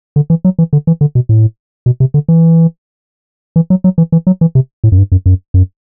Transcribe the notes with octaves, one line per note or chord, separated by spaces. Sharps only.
D3
E3
F#3
E3
D3
E3
D3
B2
A2
B2
C3
D3
E3
E3
F#3
F#3
E3
E3
F#3
E3
C3
A2
F#2
G2
F#2
F#2
F#2